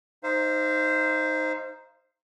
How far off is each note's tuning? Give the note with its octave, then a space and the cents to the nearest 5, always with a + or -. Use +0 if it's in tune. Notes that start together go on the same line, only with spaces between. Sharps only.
D#4 +0 C5 +0 F5 -35